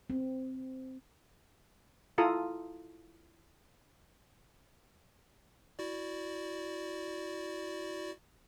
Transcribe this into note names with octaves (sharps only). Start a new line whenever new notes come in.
C4
E4 F4 A4 A#5 D#6
E4 F#4 D5